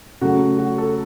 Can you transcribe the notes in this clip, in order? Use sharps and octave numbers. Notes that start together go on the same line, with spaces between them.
C#3 F#3 A3 F#4
F#4
A4